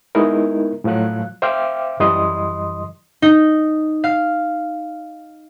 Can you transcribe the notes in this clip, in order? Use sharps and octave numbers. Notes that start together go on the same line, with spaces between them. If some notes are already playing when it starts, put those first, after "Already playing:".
G#3 B3 D#4 E4 A#4
A2 F3 F#3 F5 F#6
C5 E5 F5 G5 D6 F6
F#2 E3 G3 D#5 C6 D#6
D#4
F5